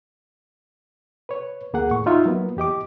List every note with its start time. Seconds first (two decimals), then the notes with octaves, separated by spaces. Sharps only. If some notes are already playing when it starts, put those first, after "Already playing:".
1.29 B4 C#5
1.73 D2 A#3 G#4 F#5
1.91 D#2 A2 C#6
2.06 D#4 F4 E5
2.25 F#3 A#3 B3
2.57 E2 G4 D#5 D6